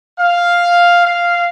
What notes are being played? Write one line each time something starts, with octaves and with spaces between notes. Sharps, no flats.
F5
F5